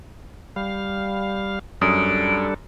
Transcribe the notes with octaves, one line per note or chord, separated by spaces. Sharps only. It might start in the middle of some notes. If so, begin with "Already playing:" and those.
G3 F5
F#2 G3 D4 A4 D#6 D7